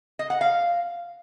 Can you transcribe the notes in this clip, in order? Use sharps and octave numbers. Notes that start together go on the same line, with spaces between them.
D#5
F#5
F5